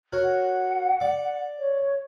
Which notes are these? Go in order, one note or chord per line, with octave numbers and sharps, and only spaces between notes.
F#4 A#4 C#5
F#5
D5 D6
C#5